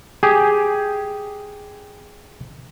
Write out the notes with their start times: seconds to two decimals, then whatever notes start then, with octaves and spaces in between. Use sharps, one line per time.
0.23 G4 G#4